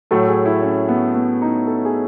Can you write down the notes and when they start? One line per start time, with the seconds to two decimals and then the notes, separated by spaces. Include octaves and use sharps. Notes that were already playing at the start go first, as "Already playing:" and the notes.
0.11 A2 F#3 A3 A4
0.28 G#4
0.46 E4
0.62 C#4
0.89 B3
1.15 B3
1.42 D#4
1.67 A4
1.85 G#4